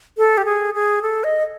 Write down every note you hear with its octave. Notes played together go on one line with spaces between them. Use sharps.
A4
G4
G#4
G#4
A4
D#5